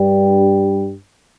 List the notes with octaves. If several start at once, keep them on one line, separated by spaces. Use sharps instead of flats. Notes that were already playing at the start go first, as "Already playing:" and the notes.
Already playing: G2 G3